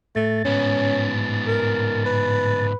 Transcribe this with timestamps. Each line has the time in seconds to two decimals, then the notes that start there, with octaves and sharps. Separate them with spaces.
0.16 A2 A3 A6
0.45 G#2 B3 C#4
1.47 A#4
2.06 B4